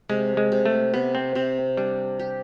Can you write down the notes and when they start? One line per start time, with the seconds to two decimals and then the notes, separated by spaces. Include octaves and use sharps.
0.09 C3 G#3
0.37 G#3
0.52 C3
0.65 A3
0.94 C3 B3
1.15 C4
1.35 C3 C4
1.77 G3 D4
2.19 G4